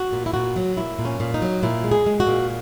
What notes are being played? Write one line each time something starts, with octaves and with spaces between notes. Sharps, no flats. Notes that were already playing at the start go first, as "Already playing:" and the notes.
Already playing: F#4
A#2
E4
A#2 F#4
F#3
A#2 E4
A#2
C#4
A#2
D#4
F#3
A#2 E4
G#3
G#4
G#3
F#4
A#2